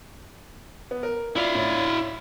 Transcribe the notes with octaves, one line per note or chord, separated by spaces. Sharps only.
B3
A#4
E4 F4 D5 E5 F5
A2 C#4 D5